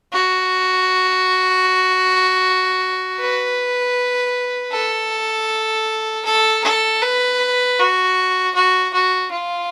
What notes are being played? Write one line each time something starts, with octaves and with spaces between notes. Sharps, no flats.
F#4
B4
A4
A4
A4
B4
F#4
F#4
F#4
F4